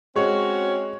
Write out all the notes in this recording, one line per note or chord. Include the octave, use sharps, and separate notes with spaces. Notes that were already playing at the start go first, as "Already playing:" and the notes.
G#3 C4 C#4 F#4 C#5